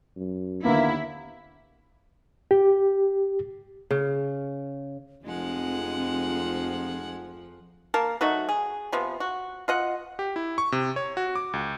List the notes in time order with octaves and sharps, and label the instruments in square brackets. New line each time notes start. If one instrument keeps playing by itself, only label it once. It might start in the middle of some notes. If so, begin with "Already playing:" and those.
[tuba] F#2
[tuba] D#2 [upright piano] D3 B3 [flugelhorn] A#3 [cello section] E4
[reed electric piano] G4
[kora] C#3
[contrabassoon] F1 [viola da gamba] F2 F3 [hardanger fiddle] G#3 F#5 [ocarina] C4
[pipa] A#3 A#4 A5
F#3 A3 D#4 F#4
G#4
C3 F3 B3
F#4
F4 D#5 F#5
[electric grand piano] G4
E4
C#6
C3
C#5
F#4
D6
C#2